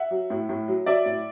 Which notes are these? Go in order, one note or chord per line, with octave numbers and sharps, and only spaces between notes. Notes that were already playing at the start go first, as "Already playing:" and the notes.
Already playing: E5 F#5
F#3
A2
A2
F#3
F#3 D5 E5
A2